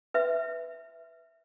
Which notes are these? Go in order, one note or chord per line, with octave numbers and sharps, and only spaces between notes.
B4 E5